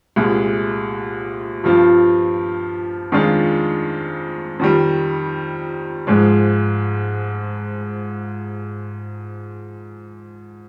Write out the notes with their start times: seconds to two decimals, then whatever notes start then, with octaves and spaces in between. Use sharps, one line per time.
0.16 C2 A#2 G#3
1.64 G2 F3 C4 F4
3.12 F2 D#3 G#3 D4 F4
4.59 F2 D#3 G3
6.07 G#2 F3 G#3